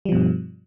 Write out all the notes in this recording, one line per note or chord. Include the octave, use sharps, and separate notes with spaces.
G2 B2 F3 G3